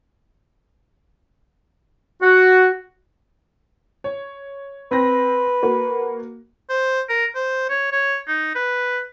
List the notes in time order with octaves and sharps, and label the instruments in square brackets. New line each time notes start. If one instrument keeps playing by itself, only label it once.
[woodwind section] F#4
[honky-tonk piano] C#5
[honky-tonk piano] C4 A#6 [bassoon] B4
[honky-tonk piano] A#3 F#4
[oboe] C5
A#4
C5
C#5
C#5
D#4
B4